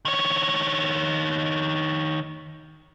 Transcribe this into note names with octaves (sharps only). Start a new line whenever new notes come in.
D#3 C#5